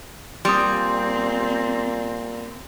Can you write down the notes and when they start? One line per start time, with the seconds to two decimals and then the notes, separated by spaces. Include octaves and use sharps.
0.45 A#2 G3 C4 C6 D#6